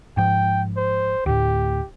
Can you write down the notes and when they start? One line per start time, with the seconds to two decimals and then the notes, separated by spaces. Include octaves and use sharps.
0.17 G#2 F3 G5
0.77 C5
1.26 D2 A2 G4